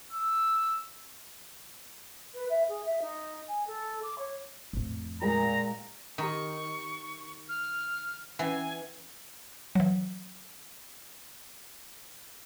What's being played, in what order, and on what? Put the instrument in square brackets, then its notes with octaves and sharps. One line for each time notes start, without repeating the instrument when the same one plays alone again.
[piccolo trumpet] E6
[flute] B4
E5
G#4
E5
D#4
G#5
A4
D6
C#5
[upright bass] F2 A2
[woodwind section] A#2 [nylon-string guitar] G#3 G#4 G5 [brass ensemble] A#5
[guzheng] D#3 [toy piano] G4 A#5 D#6 [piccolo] C#6
[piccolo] F6
[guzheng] E3 [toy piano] C#4 B4 F#5 [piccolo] G#5
[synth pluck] E3 F#3